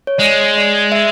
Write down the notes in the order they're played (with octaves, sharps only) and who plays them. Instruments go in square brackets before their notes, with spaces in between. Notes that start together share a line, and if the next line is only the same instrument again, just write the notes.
[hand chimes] C#5
[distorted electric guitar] G#3 [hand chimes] D5
[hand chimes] D5
E5